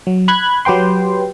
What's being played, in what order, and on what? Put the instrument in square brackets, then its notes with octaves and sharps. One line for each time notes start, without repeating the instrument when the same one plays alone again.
[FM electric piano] F#3
B5 F#6 G#6
F#3 G4 B4 G5 C6